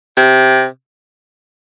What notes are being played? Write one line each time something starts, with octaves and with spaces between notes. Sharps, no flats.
C3